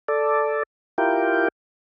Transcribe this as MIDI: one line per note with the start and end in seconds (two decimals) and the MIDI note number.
0.08 0.63 69
0.08 0.63 74
0.98 1.48 64
0.98 1.48 65
0.98 1.48 67
0.98 1.48 70
0.98 1.48 79